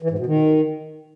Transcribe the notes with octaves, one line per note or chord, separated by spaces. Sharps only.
E3
G#2
B2
D#3